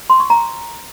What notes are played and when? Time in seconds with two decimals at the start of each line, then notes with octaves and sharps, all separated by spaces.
0.10 C6
0.20 C#6
0.30 A#5